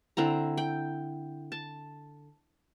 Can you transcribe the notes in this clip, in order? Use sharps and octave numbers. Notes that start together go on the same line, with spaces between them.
D3 C4 E4 A#5
G5
A5